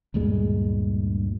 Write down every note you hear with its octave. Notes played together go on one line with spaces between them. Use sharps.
D2 G2 A#2 G#3